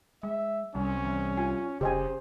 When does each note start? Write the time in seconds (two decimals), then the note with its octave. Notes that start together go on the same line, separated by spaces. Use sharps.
0.23 G#3 E5
0.75 C2 G3 C#4
1.05 E3
1.37 F4 G#5
1.81 F1 C#3 C#4 G4 C5 D#5 G#5